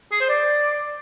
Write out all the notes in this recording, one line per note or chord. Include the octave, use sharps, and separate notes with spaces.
G#4
C5
D5